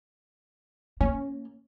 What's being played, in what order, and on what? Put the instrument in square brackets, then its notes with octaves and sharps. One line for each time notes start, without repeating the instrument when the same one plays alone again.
[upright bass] A#3 [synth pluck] C#4